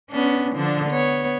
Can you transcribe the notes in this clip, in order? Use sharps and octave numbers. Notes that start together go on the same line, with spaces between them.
B3 C#4 D4
D3 F3 D4
B3 C#5